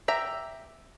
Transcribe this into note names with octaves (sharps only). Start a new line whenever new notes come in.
G4 E5 A#5